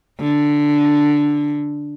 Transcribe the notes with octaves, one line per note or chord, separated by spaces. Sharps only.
D3